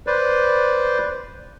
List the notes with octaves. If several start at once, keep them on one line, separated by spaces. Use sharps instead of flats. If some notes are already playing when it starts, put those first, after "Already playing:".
B4 C5 D5